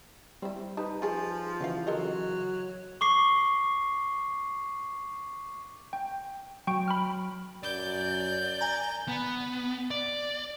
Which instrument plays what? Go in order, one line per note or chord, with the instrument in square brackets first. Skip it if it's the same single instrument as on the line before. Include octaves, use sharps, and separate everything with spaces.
[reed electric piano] G3 [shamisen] C4 E4
[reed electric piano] D#4 B4 [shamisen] G4 A5
[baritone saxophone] F3 [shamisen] G4 G#4 A5
[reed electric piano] C#3 E3 [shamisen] F#3 F#4 F5
[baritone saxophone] F#3 [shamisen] A4 A#4 D#5
[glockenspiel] C#6 D6 C7
[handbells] G5
[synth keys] F#3 [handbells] G5 C#6 D7
[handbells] B5 F6
[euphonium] F#2 [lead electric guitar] D5 [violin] G6
[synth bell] G#5 A#5
[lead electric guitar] B3
D5